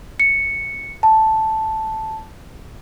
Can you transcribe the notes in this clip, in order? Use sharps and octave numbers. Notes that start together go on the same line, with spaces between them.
C#7
A5